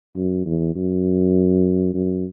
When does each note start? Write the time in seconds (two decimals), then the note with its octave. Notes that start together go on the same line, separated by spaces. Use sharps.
0.16 F#2
0.45 E2
0.75 F#2
1.94 F#2